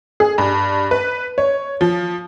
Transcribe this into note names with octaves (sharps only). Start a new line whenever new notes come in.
G#4
G2
B4
C#5
F3